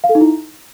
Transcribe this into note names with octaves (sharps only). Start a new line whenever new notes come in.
F5
A4
D#4
E4